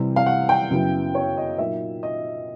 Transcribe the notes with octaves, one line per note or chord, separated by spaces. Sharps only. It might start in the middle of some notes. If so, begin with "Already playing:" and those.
Already playing: C3 E3 G3
F5
F#5
G5
F#2 C#3 F#3 B3 E4
C#5
D#5
A#2 F#3 A#3 D#4 E5
D#5